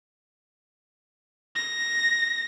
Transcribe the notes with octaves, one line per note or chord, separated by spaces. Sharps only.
A#6